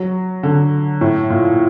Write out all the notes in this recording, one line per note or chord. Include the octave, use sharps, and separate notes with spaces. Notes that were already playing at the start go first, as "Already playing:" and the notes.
Already playing: F#3
D3
A2
A#2